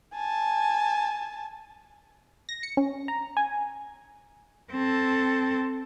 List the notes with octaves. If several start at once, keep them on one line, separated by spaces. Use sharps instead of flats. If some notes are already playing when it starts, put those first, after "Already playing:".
G#5 A5
A#6
C#7
C#4
A#5
G#5
C4 A4